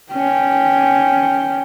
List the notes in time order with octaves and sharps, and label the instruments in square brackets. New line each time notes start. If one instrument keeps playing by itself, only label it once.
[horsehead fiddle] C#4 G5